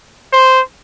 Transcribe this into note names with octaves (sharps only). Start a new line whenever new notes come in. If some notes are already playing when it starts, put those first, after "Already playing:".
C5